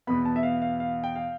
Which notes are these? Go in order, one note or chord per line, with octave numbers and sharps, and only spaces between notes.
E2 B2 B3 B5
A5
E5
F5
F5
F5
G5
F5